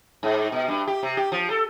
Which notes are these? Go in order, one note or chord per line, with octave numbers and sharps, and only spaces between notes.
G#2
B2
G2
G4
C3
G4
F3
A4